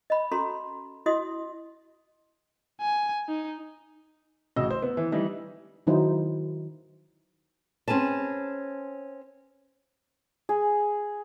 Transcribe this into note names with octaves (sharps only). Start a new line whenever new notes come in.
D#5 B5
C#4 F#4 A4 A#5 C6
E4 F#4 D#5 C6 D#6
G#5
D#4
A1 C#3 F#4 D#5 E6
C5
B3
E3
E3 G3 D#4
D#3 F#3 D#4 E4 C5
C4 C#4 G#4 B4 A5
G#4